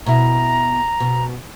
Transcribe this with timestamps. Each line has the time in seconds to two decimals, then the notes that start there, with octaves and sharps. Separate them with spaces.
0.06 B2 E4 A#5
1.00 B2